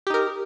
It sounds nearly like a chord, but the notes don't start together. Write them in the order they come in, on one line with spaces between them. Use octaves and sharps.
G4 D#4 A#4